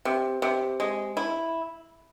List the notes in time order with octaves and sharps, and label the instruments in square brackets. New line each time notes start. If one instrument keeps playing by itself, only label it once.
[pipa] C3
C3
G#3
E4